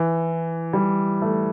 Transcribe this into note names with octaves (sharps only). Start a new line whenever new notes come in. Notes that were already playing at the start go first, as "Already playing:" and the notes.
Already playing: E3
G3
A3